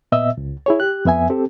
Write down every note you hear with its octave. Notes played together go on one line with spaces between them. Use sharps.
A#2 B3 D#5 E5 E6
C#2
E4 G#4 C#5
G4 F#6
F2 B3 E5 G#5
C4 G4 A4